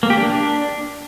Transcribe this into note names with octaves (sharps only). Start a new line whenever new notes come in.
A#3
G4
D4